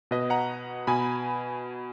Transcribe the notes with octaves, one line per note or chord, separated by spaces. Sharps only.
B2 B4 D#5
F#5 A#5
B2 G#5 B5